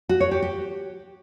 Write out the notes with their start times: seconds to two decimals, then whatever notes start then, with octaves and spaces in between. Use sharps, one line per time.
0.09 F#4
0.20 C#5
0.31 G4
0.42 G4